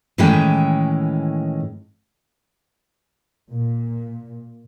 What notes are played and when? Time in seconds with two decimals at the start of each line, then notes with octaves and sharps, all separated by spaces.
0.18 A2 D#3 E3 G#3 C#4 G5
3.51 A#2